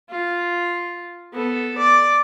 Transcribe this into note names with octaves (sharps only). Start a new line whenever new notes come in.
F4
B3 A4
D5